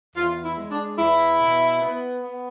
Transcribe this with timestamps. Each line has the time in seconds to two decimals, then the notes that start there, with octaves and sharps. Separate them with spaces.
0.16 E2 F4
0.44 E4
0.57 G#3
0.71 D4
0.98 E2 E4
1.41 B2
1.81 B3
2.22 B3